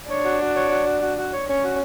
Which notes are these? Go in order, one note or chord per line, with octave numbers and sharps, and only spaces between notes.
D4 C#5
F#4
F#4
C#5
F#4
F#4
F#4
F#4
C#5
C#4 C#5
F#4